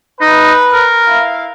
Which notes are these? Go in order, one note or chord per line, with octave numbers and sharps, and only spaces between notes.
D#4 B4
A#4
E4 F5